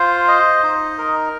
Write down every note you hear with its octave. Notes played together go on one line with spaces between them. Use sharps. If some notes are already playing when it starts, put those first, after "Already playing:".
Already playing: F4 C5
D#5
D#4
A#4